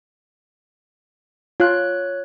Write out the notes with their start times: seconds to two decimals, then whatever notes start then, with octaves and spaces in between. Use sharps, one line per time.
1.60 F4 C#5 F#6